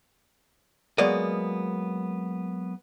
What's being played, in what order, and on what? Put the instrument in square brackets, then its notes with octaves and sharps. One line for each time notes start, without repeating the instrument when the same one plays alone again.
[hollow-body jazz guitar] F#3 G#3 A#3 B3 D5 D#5